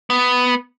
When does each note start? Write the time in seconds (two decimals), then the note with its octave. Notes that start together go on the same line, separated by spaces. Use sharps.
0.10 B3